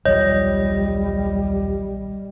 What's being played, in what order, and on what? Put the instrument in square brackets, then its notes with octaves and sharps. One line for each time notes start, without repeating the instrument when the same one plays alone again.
[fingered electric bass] D#1 B1 F3 [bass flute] G3 [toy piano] C#5 [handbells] D#5